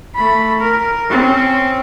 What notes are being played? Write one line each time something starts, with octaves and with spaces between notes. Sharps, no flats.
A3 B5
A#4
C4 C#4